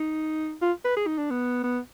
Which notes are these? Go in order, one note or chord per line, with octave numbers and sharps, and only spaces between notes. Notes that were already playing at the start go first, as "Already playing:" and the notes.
Already playing: D#4
F4
B4
G#4
D#4
D4
B3
B3